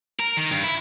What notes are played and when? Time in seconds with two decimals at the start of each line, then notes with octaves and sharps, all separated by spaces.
0.20 A#4
0.37 D#3
0.51 G2
0.63 E4